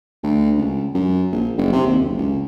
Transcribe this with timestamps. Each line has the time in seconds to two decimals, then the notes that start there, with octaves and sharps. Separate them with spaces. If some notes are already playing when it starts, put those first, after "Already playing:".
0.23 D2
0.58 C#2
0.95 F#2
1.32 A#1
1.57 F#1
1.73 C3
1.86 D#2
2.00 F#1
2.17 C#2